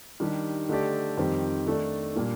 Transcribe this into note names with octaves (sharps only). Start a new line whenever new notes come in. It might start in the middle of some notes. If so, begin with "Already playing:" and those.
D#3 G3 D4 G4
D3 A3 D#4 G4 D5
F2 D#3 G3 C4 G4
D#3 A3 D4 A4 D5
A#2 G3 A#3 D4